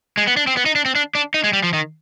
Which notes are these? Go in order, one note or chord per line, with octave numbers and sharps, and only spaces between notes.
G#3
B3
D4
C4
B3
D#4
D4
C4
D4
D4
D#4
G#3
G3
F3
D#3